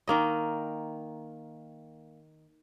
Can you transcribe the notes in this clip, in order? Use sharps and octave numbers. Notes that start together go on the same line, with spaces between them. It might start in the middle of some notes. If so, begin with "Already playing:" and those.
D#3 A#3 D#5